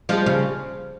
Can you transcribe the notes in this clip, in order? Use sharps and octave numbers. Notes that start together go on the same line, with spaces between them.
F3 G3 G#3
C#3 G3